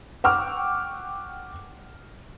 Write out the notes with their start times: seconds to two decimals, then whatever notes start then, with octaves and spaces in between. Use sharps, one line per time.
0.24 F#5 G5 C#6 D6 E6 F6